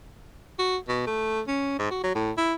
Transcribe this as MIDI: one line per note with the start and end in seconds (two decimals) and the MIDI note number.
0.59 0.77 66
0.88 1.04 47
1.07 1.41 57
1.48 1.75 61
1.79 1.88 44
1.91 2.02 66
2.04 2.12 54
2.15 2.32 45
2.37 2.54 64